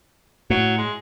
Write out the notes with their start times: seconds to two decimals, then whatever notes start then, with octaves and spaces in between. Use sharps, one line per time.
0.50 A2 F#3
0.77 G#3